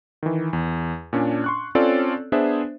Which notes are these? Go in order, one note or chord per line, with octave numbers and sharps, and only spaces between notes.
D#3 E3
E2
A#2 C#4 D4
C6 C#6 F#6
C4 C#4 F4 A4 C#5 D5
B3 D4 G#4 C5 E5